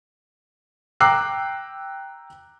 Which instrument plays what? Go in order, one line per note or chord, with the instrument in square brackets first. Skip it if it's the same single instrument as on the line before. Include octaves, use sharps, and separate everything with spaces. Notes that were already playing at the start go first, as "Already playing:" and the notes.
[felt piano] G5 A#5 D6 E6 F#6 C7